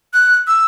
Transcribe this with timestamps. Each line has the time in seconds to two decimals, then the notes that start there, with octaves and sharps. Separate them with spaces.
0.14 F#6
0.47 E6